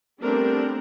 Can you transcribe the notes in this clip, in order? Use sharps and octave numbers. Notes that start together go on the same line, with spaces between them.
G3 A3 B3 C4 D4 A#4